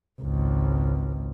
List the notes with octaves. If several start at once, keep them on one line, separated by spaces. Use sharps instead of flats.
G#1 C#2